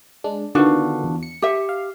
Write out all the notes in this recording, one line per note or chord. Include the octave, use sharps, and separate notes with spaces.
G#3 D4
D3 D#3 B3 D4 F4 F#4
E2
C#7
G4 E5
F5